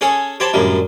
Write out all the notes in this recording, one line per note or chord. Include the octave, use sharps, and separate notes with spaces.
C#4 G#4 A4 C#5
G4 C5 C#5 G5 A5 B5
F#2 A2 D3 D#3 G3